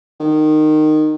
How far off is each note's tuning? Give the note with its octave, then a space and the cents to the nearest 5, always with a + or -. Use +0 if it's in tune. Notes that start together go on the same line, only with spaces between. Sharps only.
D#3 -15